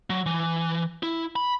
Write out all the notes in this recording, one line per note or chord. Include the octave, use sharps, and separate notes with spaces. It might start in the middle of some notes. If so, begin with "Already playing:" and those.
F#3
E3
E4
B5